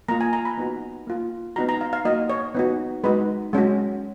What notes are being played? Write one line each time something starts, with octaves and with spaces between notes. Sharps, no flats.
A#3 F4 A#5
G#5
A#5
B5
B3 D#4 F#4
A#3 F4
B3 D#4 F#4 A#5
A#5
F5
F5
A#3 D#4 F#4 D#5
C#5
B3 D#4 F#4
G#3 D#4 F#4 B4
G#3 C#4 F#4